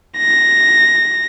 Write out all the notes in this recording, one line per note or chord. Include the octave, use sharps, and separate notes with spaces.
A#6